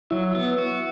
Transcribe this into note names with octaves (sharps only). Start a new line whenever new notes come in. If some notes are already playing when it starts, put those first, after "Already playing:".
F#3 E4
B3
F#4